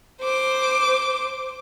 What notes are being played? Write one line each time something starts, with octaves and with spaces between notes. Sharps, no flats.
C5 D6